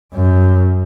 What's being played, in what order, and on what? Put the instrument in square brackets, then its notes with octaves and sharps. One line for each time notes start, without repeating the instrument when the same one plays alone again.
[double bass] F#2